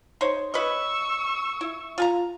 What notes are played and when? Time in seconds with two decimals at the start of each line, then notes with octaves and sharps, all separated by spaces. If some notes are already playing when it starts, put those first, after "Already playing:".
0.21 D#4 C5 C#5
0.54 B4 C#5 D#5 C#6 E6
1.61 E4
1.98 F4 G#5 A#5